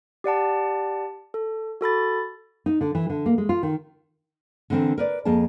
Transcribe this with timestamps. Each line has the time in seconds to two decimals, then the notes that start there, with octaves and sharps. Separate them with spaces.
0.24 G4 D5 F#5 A5
1.34 A4
1.81 F#4 A4 B5 A6
2.66 D#4
2.81 D3
2.95 E3
3.10 D3
3.26 A#3
3.38 G#3
3.49 F4
3.63 D#3
4.70 D3 E3 C4 A#4
4.98 A#4 B4 D5
5.25 F2 A#3 G#4 A5